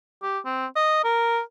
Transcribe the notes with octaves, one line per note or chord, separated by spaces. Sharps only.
G4
C4
D#5
A#4